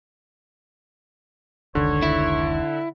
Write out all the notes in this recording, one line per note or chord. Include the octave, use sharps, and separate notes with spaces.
F1 C#2 D3 D#3 C#5
E4